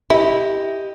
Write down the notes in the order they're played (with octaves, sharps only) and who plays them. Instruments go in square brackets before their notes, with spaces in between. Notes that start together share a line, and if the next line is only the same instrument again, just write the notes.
[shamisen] E4 [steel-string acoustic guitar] G4 D#5